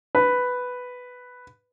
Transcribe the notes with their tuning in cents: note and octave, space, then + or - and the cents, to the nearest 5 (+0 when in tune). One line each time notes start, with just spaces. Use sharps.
B4 +5